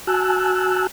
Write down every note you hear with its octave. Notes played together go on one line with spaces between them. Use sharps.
F#4 G#5 A5 E6 F#6